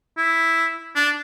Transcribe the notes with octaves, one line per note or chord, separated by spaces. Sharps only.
E4
D4